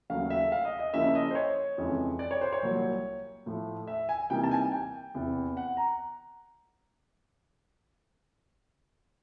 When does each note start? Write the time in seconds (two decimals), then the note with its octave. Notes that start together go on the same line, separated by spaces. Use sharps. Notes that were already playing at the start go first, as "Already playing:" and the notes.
0.10 D#2 C#3 F#3 A3 F5
0.30 E5
0.52 F5
0.65 D#5
0.79 D#5
0.93 C#3 F3 A#3 C#4 E4 E5
1.15 D#5
1.31 C5
1.35 C#5
1.78 F2 C#3 E3 G#3
2.19 D5
2.31 C#5
2.41 C5
2.53 C#5
2.62 C2 A#2 F#3
3.46 A2 F3 A3
3.87 E5
4.09 G#5
4.30 C3 E3 G3 A#3 D#4 G5
4.44 A5
4.51 G#5
4.72 G5
5.14 E2 C3 E3
5.57 F#5
5.77 A#5